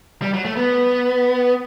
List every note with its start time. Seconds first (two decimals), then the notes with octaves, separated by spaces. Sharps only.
0.22 G3
0.34 F#3
0.45 A3
0.56 B3